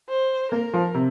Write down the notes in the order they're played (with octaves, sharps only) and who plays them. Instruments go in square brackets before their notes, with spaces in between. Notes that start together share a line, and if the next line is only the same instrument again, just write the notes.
[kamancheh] C5
[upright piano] A#3 [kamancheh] A#4
[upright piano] F3
C3